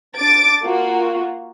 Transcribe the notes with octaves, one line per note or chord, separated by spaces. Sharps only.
D4 D6 A6 D7
A#3 F4 F#4